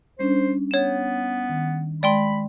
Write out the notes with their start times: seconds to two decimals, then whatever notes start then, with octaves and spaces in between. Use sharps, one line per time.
0.19 G3 C#4 D4 C5
0.71 B3 C#5 E7
1.49 D#3
2.03 G#3 D5 G5 B5 C6